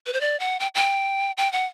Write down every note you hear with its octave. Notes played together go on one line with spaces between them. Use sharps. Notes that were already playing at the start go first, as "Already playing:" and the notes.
B4
C5
D5
F#5
G5
G5
G5
F#5